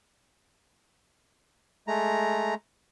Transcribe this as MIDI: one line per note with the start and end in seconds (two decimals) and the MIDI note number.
1.88 2.54 56
1.88 2.54 57
1.88 2.54 82